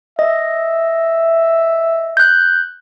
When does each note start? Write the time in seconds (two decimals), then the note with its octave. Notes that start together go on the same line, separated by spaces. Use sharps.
0.19 D#5 E5
2.17 F#6 G6